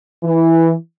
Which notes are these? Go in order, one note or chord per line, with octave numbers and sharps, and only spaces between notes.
E3